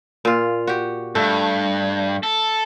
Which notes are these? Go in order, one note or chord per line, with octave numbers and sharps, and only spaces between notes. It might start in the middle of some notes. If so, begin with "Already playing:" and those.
A#2 F4
F#4 G4
G2 A3
A4